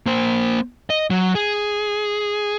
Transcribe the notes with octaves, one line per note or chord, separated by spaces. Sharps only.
A#3 C5
D#5
F#3
G#4